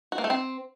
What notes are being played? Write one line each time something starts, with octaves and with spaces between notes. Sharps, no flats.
F#4
A#3
A3
C4